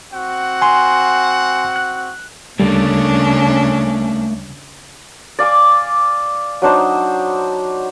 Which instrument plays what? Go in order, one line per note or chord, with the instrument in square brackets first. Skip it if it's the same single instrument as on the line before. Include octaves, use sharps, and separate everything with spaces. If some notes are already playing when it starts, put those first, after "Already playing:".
[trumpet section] C4 F#4 F#5
[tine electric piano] G#5 C6
F#6
[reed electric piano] D2 G3 [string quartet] C#3 C#4 D4 [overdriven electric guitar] A3 A#3
[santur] D5 F5 G#5 D6
F#3 D4 D#4 C5